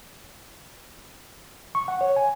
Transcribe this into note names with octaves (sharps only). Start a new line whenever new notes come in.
C#6
F#5
C#5
G#5